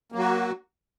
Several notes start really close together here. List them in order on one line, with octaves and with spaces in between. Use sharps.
A#3 F#3 F#4